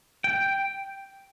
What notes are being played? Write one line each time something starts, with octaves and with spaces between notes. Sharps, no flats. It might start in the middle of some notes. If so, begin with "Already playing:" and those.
G5